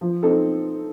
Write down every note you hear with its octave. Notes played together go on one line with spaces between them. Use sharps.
F3
C4 D#4 A4